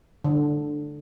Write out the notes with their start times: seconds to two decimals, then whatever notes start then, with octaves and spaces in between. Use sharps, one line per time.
0.24 D3